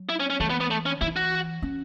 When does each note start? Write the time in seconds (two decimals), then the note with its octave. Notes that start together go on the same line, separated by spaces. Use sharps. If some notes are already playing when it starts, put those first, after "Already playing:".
Already playing: F#3
0.09 E4
0.20 C#4
0.30 C#4
0.40 E3 A3
0.50 B3
0.60 B3
0.71 A3
0.86 C#4
1.01 E3 E4
1.16 F#4
1.62 C#4